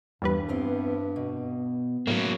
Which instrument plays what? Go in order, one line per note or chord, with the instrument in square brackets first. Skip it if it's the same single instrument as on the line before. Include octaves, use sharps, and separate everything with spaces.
[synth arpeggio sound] E2 G3 B4 [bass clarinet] G2
[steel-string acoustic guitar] B3 C4 E4
B2
[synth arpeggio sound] A2 [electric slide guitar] F#3 A#3